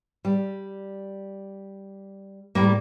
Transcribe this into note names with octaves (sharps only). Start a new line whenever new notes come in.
G3
A2 G3 A#3